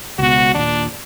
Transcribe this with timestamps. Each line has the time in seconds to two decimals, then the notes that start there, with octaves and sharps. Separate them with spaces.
0.19 C#2 B2 F#4
0.54 D#2 A#2 D4